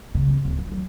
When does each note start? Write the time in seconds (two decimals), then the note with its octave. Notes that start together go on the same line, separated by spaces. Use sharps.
0.15 C#3
0.28 G#1
0.45 D1
0.59 F3
0.72 F#3